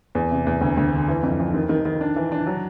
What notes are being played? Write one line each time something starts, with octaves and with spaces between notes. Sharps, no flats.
E2
C3
E2
D2
D2
D3
E3
F2
F2
D#3
D#3
D#3
D4
E3
D4
F#3